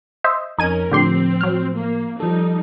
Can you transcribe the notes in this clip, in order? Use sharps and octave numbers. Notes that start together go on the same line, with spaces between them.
C5 D#5 E5
F2 C#4 D#4 A#4 G#5 D#7
A2 D3 F3 C4 G4 C6
F#3 F6
A#3
F3 G3 D#4 A4